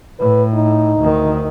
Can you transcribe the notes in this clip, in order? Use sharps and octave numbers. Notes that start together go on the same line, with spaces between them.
A2 B4
D#4
D2 D#3